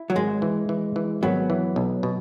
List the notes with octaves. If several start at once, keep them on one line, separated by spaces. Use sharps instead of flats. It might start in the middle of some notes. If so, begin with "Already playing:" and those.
Already playing: E4
F#3
G#1 G#3
E3
E3
E3
G#1 F#3 B3
E3
B1
B2